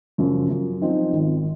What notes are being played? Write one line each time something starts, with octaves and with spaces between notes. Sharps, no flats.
F#2 C#3 F3
F#2
F3 C4 D#4
G#1